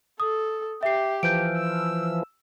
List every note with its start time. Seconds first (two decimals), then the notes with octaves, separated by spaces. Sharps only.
0.20 A4 D#6
0.83 G4 E5 C7
1.23 E3 F3 G6 D7
1.57 E6